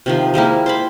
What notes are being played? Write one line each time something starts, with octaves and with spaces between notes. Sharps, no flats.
C3 D#3 F3
G3 G#3 A#3 E4
C5 A5 B5